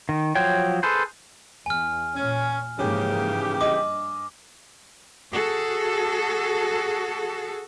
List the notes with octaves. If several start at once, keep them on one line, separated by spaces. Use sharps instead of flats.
D#3
F3 F#3 C#5 G5
G#4 A4 B4 C5
E2 G#5 F6
A#2 C#4
G#2 C#3 E3 F3 A#3 C#4 G4
G2 D#5 D6
F#4 G#4 A4